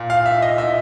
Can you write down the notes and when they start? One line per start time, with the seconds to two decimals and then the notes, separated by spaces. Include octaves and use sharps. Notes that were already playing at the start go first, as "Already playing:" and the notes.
Already playing: A#2
0.10 F5
0.26 E5
0.42 D#5
0.58 A#2 E5